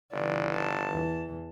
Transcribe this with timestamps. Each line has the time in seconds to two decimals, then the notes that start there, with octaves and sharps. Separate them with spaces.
0.13 G1 C#3 E3 D5
0.54 A5
0.89 E2 E3